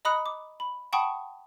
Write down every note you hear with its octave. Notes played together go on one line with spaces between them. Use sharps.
D#5 A#5 B5 D#6 F#6 C#7
D6
B5
F#5 G5 A5 B5 C#6 D#6